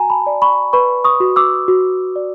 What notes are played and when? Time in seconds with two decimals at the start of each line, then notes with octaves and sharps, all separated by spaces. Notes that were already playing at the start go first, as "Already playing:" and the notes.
Already playing: F#4 G#5 A#5
0.10 A5 B5
0.27 D5
0.42 B5 C#6
0.73 B4 B5 C#6
1.04 C#6 D#6
1.20 F#4
1.36 D6 E6
1.68 F#4
2.16 D5